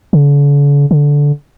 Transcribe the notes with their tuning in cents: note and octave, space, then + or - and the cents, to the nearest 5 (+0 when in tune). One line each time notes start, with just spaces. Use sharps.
D3 -45
D3 -15